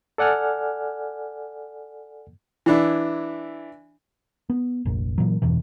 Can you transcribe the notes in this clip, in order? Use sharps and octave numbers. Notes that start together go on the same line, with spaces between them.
A4 D5 F#5 G#5 F6
E3 D4 E4
B3
F1 A#1
A#2 E3 F#3
G1 E2 B2 E3